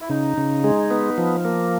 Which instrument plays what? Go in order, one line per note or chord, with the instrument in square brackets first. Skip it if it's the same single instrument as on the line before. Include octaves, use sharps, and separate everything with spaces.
[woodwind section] E4
[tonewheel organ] C#3 [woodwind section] D#4
[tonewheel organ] C#3
G#3
B3
F3
A#3